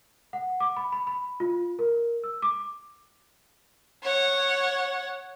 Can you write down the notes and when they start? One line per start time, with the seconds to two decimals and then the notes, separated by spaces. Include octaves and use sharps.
0.33 F#5
0.60 D6
0.77 B5
0.92 B5
1.07 B5
1.40 F4
1.79 A#4
2.24 E6
2.42 D6
4.03 C#5 F#5